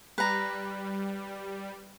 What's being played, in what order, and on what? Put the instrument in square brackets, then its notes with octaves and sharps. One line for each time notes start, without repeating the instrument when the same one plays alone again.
[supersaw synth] G3 [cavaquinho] B4 A#5